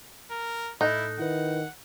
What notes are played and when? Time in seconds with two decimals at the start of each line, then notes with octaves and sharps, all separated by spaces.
0.31 A#4
0.81 A2 D#4 E4 A4 F#6
1.19 D#3 E4 B4 F#5